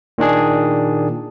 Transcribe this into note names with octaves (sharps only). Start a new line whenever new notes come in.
A#2 D#3 D4 G#4